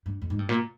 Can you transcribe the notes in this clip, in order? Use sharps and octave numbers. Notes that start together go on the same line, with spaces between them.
G2
F2
G#2
G2
A#2